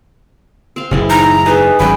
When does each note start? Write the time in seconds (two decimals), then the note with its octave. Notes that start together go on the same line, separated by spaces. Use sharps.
0.76 C4 F5
0.91 F#1 A2 E3 G#3 C4 E4
1.10 D#4 A#5
1.46 G#3 D#4 B4 E5
1.80 G#1 D2 F#3 G#3 C#4 G5 B5